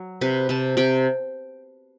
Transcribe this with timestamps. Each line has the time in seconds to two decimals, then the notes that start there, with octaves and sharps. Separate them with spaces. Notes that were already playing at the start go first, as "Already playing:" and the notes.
Already playing: F#3
0.21 C3 B4
0.49 C3 A5
0.77 C3 G5